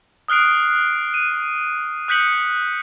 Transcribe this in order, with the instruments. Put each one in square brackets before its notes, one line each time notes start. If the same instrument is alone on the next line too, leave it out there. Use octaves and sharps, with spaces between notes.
[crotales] D#6 F6 F#6 C7 D7
D#7
D#6 F#6 G6 B6 C#7 F#7